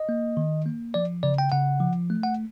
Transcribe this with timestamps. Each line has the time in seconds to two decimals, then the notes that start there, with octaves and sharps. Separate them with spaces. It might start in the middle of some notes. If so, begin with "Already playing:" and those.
Already playing: D#5
0.09 A#3
0.37 D#3
0.66 A#3
0.94 F3 D5
1.23 C#3 D5
1.38 G5
1.52 C#3 F#5
1.80 F3
2.10 A3
2.23 F#5